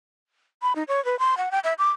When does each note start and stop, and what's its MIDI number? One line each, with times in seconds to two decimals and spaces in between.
0.62 0.73 83
0.76 0.83 63
0.88 1.03 73
1.05 1.18 71
1.19 1.37 84
1.37 1.49 78
1.51 1.59 79
1.64 1.73 76
1.79 1.90 86